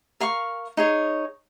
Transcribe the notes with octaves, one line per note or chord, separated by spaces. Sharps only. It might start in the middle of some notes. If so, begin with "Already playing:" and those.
A#4 F5 C#6
D#4 G#4 C#5